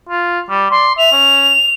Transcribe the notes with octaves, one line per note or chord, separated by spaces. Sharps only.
F4
G3
D5 C6
E5 F7
C#4